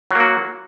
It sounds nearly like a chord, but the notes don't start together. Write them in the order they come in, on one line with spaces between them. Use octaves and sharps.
F#3 A#3 F#4